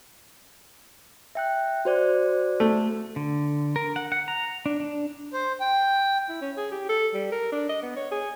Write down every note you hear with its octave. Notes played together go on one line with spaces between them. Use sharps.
E5 G5 F#6
F#4 C5 D5
A3
D3
A#4
F#5
F#5
A#5
D4
D4
C5
G5
E4
C#4
G#4
G4
A4
G3
A#4
D4
D#5
B3
C#5
G#4